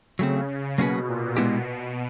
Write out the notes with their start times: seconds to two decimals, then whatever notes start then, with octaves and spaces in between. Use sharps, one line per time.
0.19 C#3 F#3 A3 C4
0.78 B2 F#3 A#3 C#4 F#4 B4
1.08 A#2
1.36 B2 G#3 B3 E4 G4